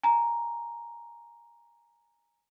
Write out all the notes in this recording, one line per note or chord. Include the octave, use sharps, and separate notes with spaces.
G#5 A#5